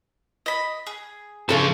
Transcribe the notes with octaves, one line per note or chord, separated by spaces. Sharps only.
D#5 B5
G#4
G2 C#3 F3 A4 A5